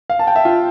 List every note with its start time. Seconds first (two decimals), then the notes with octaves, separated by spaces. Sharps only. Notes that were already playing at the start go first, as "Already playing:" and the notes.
0.10 F5
0.19 A5
0.27 G5
0.36 E5
0.45 F4